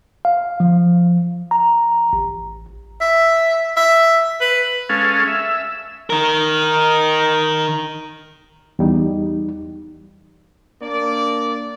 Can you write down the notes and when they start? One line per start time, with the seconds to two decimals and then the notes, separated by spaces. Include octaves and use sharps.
0.25 F5
0.60 F3
1.51 A#5
2.13 A1
3.01 E5
3.77 E5
4.41 B4
4.89 G#3 C#4 A4 F5
5.27 E5
6.10 D#3 A#4
8.79 E2 G3 D#4
10.82 A#3 D4 D5